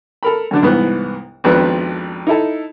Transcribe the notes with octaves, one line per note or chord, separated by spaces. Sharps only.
A4 A#4 B5
F#2 D3 D4
C2 G#2 E3 B3
G#1 F2 B3 D4 B4
D#4 E4 A4